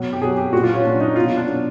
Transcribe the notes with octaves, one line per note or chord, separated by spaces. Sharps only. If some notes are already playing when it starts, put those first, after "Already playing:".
Already playing: B2 F#3
G4
B2 F#3 G#4
G4
A#2 F#3 F#4
F4
C#4
A#2 F#3 D4
D#4
B2 F#3 F4
D4
B2 F#3